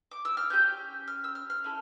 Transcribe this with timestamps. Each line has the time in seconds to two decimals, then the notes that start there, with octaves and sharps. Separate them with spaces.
0.11 D6
0.25 E6
0.37 F6
0.50 C#4 G4 G6
1.08 F6
1.24 E6
1.35 F6
1.50 F6
1.64 A3 C#4 E4 A4